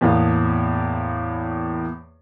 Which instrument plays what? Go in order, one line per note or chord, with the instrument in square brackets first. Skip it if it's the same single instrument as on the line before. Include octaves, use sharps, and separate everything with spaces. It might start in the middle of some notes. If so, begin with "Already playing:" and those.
[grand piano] E2 A2 A#3 B3